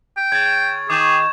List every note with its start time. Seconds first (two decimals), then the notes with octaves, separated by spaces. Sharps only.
0.17 G5
0.32 C#3 G#6 A6
0.90 D#3 G#4 D6 G6 E7